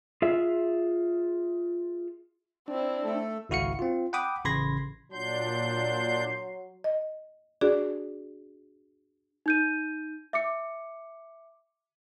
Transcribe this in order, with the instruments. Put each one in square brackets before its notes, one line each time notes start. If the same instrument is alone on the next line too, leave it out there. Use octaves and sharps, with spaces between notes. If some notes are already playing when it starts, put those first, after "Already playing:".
[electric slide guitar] F4 G#4 E5
[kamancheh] C4 E4 [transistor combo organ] D4
[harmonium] A3 A4
[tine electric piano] G#1 C#2 E4 F#4 F5 C#7
C4 F4
F#5 G5 B5 D6 D#6
A1 C#3 B5 C6 G#6 A#6
[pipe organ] A#2 D4 G6 [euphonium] F#3 [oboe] C6
[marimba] D#5
D4 F#4 G#4 D5
[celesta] D#4 G6 D#7
E5 D6 C#7